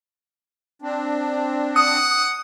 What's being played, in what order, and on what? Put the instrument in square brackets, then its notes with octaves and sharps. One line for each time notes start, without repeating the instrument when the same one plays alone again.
[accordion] C4 D4
[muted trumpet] F#5 [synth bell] D#6